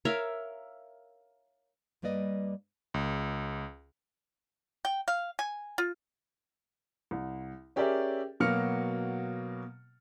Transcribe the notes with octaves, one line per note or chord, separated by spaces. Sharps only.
A#4 C#5 E5 F5
G2 G3 A#3 B4 D5 D#5
C#2
G5
F5
G#5
F4
C2
C#4 G4 G#4 A#4 D5 E5
B2 F#3 A#3 F6 C#7